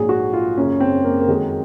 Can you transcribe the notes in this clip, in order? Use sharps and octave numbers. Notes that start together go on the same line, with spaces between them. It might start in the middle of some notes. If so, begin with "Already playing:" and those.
Already playing: A#1 G#2 F#3 G#4
F#4
F4
F#1 F#2 C#3 C#4
C4
A#3
A#3
F2 D#3 F#3 G#3